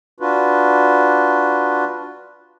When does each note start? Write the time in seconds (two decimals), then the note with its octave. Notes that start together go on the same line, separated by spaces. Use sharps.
0.20 D4 F4 F#4 B4